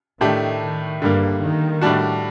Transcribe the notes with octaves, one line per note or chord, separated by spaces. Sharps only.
A2 D#3 A3 D4 G4
D#3
G2 D3 G3 A#3
D#3
A2 G3 D4 F#4